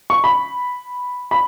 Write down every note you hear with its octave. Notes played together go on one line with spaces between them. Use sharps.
C#6
B5
B5